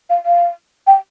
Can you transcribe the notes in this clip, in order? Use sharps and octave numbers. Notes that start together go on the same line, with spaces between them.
F5
F5
G5